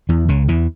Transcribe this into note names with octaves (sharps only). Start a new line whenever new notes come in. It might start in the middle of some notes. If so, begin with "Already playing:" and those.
E2 E3
C#2 C#3
E2 E3